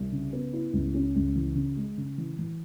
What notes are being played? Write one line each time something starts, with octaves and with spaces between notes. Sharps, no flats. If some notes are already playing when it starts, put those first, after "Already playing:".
Already playing: C2
C#3
B3
E4
C#2
C#4
C#2
E3
C#3
G#3
C#3
E3
E3